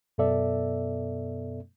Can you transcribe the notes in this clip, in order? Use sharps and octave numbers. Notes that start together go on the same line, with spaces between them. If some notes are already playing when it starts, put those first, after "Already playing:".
F#2 B2 B3 A4 D5 E5